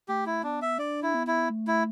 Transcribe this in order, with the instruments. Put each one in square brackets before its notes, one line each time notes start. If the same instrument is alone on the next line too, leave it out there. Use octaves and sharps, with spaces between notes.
[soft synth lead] A3 [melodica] G4
[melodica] E4
[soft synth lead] B3 [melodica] D4
[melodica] E5
[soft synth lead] D4 [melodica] D5
[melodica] E4
[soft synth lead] B3
[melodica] E4
[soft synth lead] A3
[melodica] E4